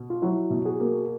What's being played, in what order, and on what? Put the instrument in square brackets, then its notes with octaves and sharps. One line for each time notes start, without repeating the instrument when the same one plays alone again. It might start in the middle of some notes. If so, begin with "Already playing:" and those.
Already playing: [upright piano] B2
[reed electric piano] F4
[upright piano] F#3 [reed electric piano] E4 F#4
[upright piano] B2
[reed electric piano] F#4 G#4
[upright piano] A#3